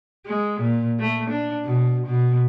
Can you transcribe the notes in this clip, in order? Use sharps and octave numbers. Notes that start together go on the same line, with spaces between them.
G#3
A#2
A3
D4
B2
B2